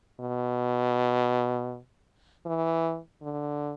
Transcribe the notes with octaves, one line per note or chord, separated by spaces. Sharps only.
B2
E3
D3